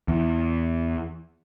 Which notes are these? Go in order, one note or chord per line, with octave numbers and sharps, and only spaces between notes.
E2